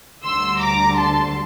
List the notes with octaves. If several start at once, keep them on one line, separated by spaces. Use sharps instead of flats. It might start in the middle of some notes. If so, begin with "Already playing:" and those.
D2 D3 G3 C6 E6
A#5 D6
A5 C6